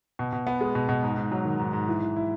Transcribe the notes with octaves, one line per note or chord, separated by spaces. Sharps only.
B2
B2
B3
G#3
B2
B2
G#2
G#2
F#3
D#3
G#2
G#2
E3
E3
E4